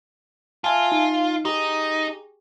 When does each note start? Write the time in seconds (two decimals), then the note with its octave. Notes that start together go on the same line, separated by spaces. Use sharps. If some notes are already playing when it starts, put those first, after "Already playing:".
0.64 F4 E5 G#5 A5
0.92 D#4
1.45 D#4 G4 G#4